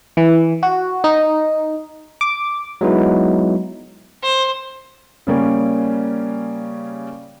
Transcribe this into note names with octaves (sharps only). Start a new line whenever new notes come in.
E3
F#4
D#4
D6
F#3 G#3 B3 D#4 E4
C5
C#3 G3 A#3 C#4